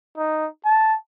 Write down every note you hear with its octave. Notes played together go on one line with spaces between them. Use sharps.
D#4
A5